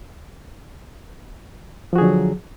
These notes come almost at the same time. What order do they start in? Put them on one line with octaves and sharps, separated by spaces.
F3 F#4 G#4 D3 F#3